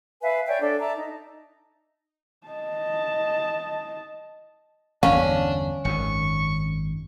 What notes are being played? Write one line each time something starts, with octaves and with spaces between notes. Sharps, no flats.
B4 E5 F5 G#5
C#5 D5 E5 G5
D4 A4 D5
E5 A5 A#5
D#4
D#5 A5
G1 E2 D3 C#4 D4 F5
G#1 F#2 D#3 C#6